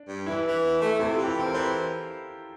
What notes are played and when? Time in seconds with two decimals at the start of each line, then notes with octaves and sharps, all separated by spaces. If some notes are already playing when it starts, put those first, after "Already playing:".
Already playing: D4
0.08 G2
0.26 E3 E4
0.45 E3
0.63 E2
0.81 A3
0.99 C3 E4
1.13 F4
1.19 E3
1.24 G4
1.36 C4 A4
1.46 A#4
1.54 E3 C5